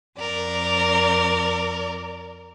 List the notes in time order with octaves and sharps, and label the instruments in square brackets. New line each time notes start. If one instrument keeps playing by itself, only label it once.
[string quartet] F2 A#4 D5